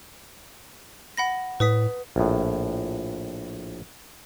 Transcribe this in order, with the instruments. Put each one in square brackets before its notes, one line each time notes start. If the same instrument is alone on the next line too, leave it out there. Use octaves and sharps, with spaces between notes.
[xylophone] F#5 B5 A#6
[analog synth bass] A2 [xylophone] B4 D#6 B6
[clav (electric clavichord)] A#1 A2